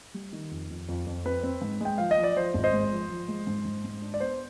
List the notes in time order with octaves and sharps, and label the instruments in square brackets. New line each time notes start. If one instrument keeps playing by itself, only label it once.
[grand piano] G3
D#3
F2
F2
F2
F2
C4 B4
C4
G#2
G#3 G5
F3 F5
D#5
F3
D5
F3 C5
G#1
C5 D#5
G#3
F3
F3
G#3
G#2
G#2
G#2
D4
D5
B3 C5